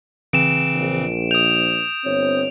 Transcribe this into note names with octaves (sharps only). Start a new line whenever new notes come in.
C#3 E3 C4 D7 E7
A#1
D#6 G6 F7
G1 C4 C#5